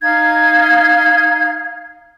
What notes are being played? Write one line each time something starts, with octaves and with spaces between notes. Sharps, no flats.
D#4 F5 G#6